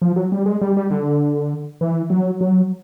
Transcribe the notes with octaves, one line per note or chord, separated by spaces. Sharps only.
F3
F#3
G3
G#3
G3
G3
D3
E3
F#3
F#3